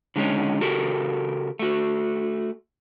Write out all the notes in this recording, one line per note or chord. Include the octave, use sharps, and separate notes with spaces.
D3 F#3 G#3 C#4 D#4
C#3 F#4 G4 A4 A#4
A3 F#4